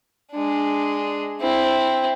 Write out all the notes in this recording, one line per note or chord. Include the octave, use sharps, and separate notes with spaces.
G#3 D4
C4 E4